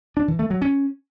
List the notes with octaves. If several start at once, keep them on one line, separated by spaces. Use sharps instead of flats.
D4
E3
A3
F#3
C#4